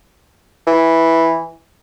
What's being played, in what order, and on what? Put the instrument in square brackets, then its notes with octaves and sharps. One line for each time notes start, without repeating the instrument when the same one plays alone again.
[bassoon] E3